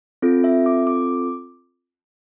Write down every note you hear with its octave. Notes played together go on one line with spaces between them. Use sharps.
C4 F4 A4
E5
D6
D6